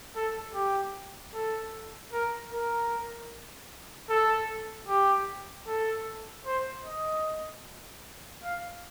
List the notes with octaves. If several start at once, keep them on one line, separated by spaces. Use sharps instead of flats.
A4
G4
A4
A#4
A#4
A4
G4
A4
C5
D#5
F5